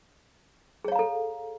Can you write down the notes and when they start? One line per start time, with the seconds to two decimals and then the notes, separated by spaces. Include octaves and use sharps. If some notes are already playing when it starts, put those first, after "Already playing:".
0.85 G#4
0.88 C#5
0.92 F5
0.95 A#5
0.99 A4